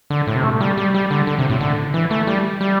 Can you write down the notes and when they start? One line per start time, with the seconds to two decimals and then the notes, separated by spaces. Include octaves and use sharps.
0.10 D3
0.27 A2
0.36 C3
0.44 A3
0.61 G3
0.78 G3
0.94 G3
1.10 D3
1.27 D3
1.39 C3
1.50 A2
1.61 D3
1.94 E3
2.11 A3
2.27 G3
2.61 G3